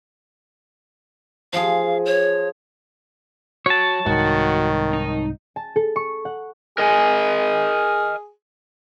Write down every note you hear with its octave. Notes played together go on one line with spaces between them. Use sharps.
F3 G#4 F5
C#5
F#3 F#4 C#5 A5
C2 G#2 D#3 F#4
D#4
A5
A4
C#6
F#5
G#4 A#4 D#5 G#5